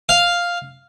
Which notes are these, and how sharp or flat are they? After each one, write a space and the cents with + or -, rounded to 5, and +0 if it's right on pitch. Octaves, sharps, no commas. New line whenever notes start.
F5 +0